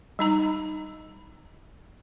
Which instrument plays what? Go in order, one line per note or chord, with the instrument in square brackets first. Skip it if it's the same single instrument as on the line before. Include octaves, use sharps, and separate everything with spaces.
[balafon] G3 D#4 A#5